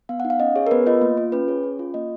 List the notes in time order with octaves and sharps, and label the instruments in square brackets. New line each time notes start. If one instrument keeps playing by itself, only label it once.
[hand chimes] B3 F5
F#5
D#4
F5
C#4 D#5
G#4 C#5
A#4
B3 B4
F4 D#5
A#3
F4
C#4 B4
G#4 C#5
C#4
F4
A#3 D#5